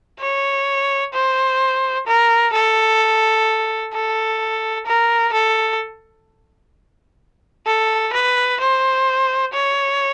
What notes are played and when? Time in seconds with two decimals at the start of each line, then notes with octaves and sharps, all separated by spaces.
0.20 C#5
1.13 C5
2.07 A#4
2.53 A4
3.94 A4
4.86 A#4
5.33 A4
7.66 A4
8.14 B4
8.61 C5
9.53 C#5